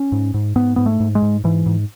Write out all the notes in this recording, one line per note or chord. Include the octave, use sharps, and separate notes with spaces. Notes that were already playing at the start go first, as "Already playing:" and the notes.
Already playing: C#4
G#2
G#2
G#2 B3
G#2 B3
A3
G#2
G#3
G#2
G#2 E3
G#2